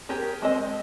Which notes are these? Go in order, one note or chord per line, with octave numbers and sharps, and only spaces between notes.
G4 G#4 A#4
G#3 C4 D#5